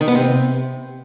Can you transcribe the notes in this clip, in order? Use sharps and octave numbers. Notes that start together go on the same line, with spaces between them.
D#3
B3
C3